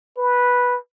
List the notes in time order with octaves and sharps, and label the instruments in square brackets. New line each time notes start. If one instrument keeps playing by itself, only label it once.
[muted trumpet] B4